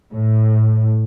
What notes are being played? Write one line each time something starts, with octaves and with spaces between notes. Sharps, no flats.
A2